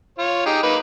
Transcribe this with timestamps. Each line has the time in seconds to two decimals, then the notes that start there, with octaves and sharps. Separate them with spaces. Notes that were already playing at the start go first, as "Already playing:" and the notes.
0.18 F4 C#5
0.46 D#4 G4 G#4
0.63 A#3 D#4 B4